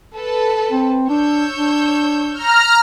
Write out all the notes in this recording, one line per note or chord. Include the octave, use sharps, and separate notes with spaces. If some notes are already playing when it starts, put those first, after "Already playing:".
A4 B4
C4
D4 C#5 E6 G6
D4
A#5 F6